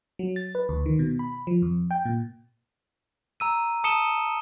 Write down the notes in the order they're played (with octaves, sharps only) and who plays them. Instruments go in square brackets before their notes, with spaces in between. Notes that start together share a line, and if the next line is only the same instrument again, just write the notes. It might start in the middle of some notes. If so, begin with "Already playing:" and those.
[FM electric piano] F#3
A6
B4
D2
D#3
B2
B5
F3
F2
G5
A#2
[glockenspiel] A#5 E6 D#7
A5 D#6 C#7 D#7 E7 G7